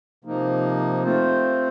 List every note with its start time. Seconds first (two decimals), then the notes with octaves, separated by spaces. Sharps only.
0.24 C3 F3 A#3 D#4
1.03 A3 C4 F4 C5